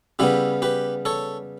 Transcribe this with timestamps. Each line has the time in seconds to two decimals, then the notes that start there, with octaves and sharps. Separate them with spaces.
0.19 C#3 G3 B3 E4 G4
0.62 G4 B4
1.05 A4 C#5